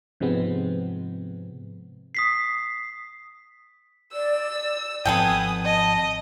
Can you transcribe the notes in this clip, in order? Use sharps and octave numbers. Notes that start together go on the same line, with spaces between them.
G#2 C3 F3 G#3 B3 C4
D#6 B6 C7
D5 E6
G#1 F3 B3 C4 A4 G5 G#5 D#6
D#5 A5